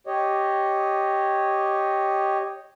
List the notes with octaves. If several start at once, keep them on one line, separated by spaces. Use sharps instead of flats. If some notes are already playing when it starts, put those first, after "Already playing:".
G4 C#5 D#5